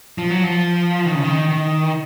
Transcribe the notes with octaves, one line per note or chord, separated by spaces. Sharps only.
F3
F#3
F3
D#3
C#3
D#3
D#3